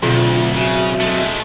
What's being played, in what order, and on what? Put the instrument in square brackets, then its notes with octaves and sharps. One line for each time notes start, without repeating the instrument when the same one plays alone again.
[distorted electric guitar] D2 [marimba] B2 [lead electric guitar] F#3 C4 [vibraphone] F4
[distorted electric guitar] C#3 [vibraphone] F#4 E5
[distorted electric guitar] G#3 A3